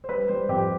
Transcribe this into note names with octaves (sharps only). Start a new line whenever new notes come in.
C5
G3 B4
G3 C5
F2 G4